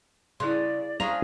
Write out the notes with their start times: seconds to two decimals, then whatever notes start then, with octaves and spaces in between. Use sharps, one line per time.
0.40 C#3 E4 G#4 D5 C6
1.00 C#4 D4 F4 G#4 A#5